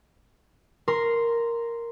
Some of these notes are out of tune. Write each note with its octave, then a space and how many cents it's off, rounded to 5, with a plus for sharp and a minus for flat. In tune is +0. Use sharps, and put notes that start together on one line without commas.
A#4 +0 C6 -5